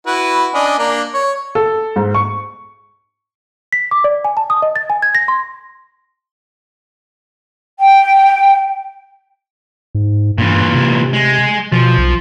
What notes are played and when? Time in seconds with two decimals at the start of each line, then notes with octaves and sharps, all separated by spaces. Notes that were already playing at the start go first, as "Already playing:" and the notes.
0.06 E4 F#4 B4
0.54 C#4 D4 D#5
0.79 A#3 D4
1.14 C#5 C#6
1.55 A4
1.96 G#2
2.14 C#6
3.73 B6
3.91 D6
4.04 D5
4.25 G#5
4.37 A5
4.50 D#6
4.62 D#5
4.76 A6
4.90 G#5
5.02 G#6
5.15 A#6
5.28 C6
7.79 G5
9.95 G#2
10.38 G2 A#2 E3
10.74 C3
11.13 G#3
11.72 B2 F3
11.98 B1